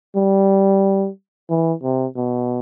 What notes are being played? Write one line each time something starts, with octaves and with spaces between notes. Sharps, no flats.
G3
E3
C3
B2